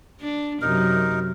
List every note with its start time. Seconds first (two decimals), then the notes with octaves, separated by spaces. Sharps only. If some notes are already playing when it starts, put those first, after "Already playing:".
0.21 D4
0.61 F#2 C3 D#4 A#4